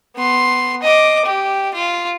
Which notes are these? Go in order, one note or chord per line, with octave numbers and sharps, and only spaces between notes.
B3 C6
D#5 D6
G4
F4